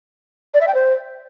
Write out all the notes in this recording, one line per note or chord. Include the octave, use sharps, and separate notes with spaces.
D5
E5
G5
C5